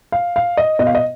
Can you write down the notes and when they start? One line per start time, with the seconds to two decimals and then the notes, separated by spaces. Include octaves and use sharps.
0.12 F5
0.36 F5
0.57 D#5
0.79 B2 D#5
0.87 F5
0.95 D#5